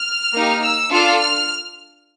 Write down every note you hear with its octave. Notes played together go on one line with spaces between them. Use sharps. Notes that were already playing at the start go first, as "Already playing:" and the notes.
Already playing: F6
A#3 D#4 G4
E6
D4 F4 A4 F6
F6